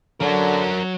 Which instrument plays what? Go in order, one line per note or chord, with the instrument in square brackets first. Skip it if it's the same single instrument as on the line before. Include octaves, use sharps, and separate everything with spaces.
[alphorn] D3 [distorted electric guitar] F#3 [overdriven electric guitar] C#4 A#4